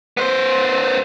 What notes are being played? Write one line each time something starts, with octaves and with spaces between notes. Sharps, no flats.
B3 C5